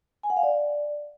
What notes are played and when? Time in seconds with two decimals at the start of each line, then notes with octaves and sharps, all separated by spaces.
0.23 G#5
0.30 F#5
0.37 F5
0.43 D5